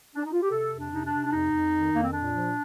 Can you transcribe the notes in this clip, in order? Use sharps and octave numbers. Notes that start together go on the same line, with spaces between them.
D4
D#4
F4
G4
C3 A4
F2
D4
C3 D#4
D4
C3
D4
F2 D#4
F2
D#3
F2 A#3
C4
A#2 D4
F3